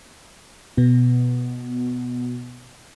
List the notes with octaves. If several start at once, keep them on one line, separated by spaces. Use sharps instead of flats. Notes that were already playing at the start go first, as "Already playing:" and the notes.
B2 B3